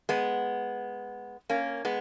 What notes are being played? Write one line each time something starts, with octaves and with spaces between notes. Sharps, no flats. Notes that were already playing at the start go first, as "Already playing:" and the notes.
G#3 B3
A#3 C#4
G#3 B3